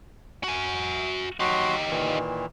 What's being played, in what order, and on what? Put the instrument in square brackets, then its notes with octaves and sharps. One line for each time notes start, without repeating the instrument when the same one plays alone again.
[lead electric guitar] F#4 G#5
[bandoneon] F#3 F#4 C6 [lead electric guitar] D#4 G4
[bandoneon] A#2 D#3 E3